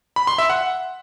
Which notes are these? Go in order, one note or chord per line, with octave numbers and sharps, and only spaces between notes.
B5
C6
E5
F#5